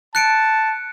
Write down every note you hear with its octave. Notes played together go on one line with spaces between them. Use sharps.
A5 F#6 C#7 D7